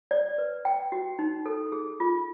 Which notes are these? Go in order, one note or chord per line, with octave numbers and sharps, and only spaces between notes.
D5
B4
G5
F#4
D#4
A4
G#4
F4